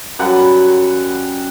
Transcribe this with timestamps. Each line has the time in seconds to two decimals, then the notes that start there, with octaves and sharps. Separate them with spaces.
0.19 F#2 G3 F#5